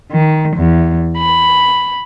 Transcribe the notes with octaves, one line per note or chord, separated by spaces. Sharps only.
D#3
E2
B5